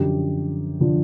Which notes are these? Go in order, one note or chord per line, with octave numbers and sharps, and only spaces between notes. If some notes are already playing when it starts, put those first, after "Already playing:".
Already playing: F#2 D3 F3 G4
D3 F3